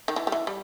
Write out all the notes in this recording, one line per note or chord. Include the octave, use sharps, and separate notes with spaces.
D#3
E3
G3
E3
G3